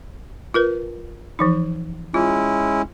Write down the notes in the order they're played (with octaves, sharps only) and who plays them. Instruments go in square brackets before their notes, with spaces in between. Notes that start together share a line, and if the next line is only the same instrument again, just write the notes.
[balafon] F4 A#4 B4
E3 F3 D#4
[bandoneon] G#3 C#4 E4 [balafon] F4